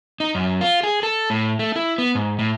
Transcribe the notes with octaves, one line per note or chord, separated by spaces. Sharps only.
D#4
F#2
F4
G#4
A4
A2
A3
E4
B3
G#2
A2